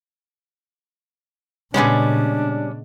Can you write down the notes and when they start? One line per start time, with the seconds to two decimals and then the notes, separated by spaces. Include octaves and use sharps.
1.74 A#2 C#3 G3 G#3 B3 C#4 D4 G#4